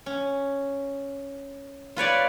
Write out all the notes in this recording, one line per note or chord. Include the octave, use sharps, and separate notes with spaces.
C#4
F4 B4 C#5 D5